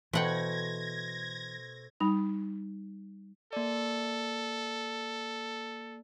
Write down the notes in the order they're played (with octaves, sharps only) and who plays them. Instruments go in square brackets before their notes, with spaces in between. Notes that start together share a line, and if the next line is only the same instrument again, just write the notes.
[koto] B2 F#5 G5 [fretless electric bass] E3 [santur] A3 C5 [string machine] G#6 A#6
[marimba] G3 D#4 B5
[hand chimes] A#3 D5 [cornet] A4